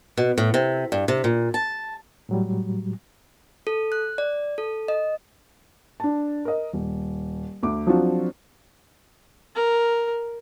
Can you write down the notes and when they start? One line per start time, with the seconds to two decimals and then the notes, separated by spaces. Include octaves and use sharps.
0.17 B2
0.38 A2
0.54 C3
0.92 G2
1.08 C3
1.24 A#2
1.54 A5
2.29 A2 F#3 G3
3.67 A4
3.92 F#6
4.18 D5
4.58 A4
4.88 D#5
6.00 D4 A5
6.45 A#4 D#5
6.73 D#1
7.63 D2 D6
7.87 F3 F#3 C4 D4 F4 F#4
9.56 A#4